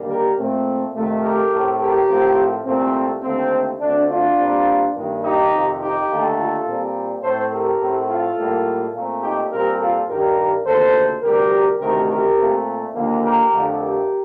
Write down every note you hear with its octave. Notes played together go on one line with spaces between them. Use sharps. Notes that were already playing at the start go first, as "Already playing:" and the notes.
Already playing: D#2 D3 G3 A#3
G4 A#4
A#2 A3 C4
F2 C3 D#3 A3
G4 A#4
A2 A3 C4
G4 A#4
A2 F3 A3 C4
C2 A#2 A3 C4
D#2 D3 A3 C4
D2 D3 A3 C4 D4
D4 F4
A#2 G3 C4
G2 D#3 A#3
D#4 G4
F2 C3 D#3
D#4 G4
D#2 D3 A3
F4 A4
A#2 G3 C4
A2 A3 C4 A4 C5
G4 A#4
A2 A3 C4
F4 A4
A2 G3 A#3
A#2 A3 C4
D#4 G4
A#2 G3 C4 G4 A#4
F4 A4
G2 D#3 G3 G4 A#4
D2 C3 D#3 A#3 A4 C5
D2 C3 G3 G4 A#4
D2 C3 D#3 A3 C4 G4 A#4
G4 A#4
A#2 A3 C4
D#2 D3 F3 A#3
G4 A#4
F2 D3 A3
G4 A#4